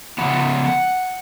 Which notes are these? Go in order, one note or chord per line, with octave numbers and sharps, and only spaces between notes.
C#3 F3 B3 F#5